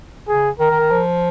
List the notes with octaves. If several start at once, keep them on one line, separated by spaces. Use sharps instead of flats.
C#3 G#4
D#3 A#4
D#3
D#3
F3